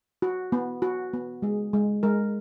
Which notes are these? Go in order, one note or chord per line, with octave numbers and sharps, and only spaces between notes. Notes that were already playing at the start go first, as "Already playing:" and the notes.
F#4
B3
F#4
B3
G#3 G#4
G#3
G#3 A#4